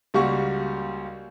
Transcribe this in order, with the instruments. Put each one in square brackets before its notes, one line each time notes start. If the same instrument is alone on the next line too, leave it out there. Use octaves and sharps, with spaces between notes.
[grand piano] C#2 G3 A#3 F#4 C#6